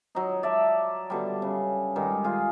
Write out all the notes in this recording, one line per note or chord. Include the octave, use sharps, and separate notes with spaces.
F#3 D#4
D5 E5 A5
B2 D3 G3
C#3
G2 D#3 G#3
F4 G#4